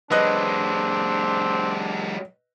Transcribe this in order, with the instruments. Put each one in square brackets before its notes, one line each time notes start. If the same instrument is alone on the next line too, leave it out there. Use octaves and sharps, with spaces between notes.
[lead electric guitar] F#3 G#3 [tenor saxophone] C4 [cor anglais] D4 [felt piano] B4 D#5 F#6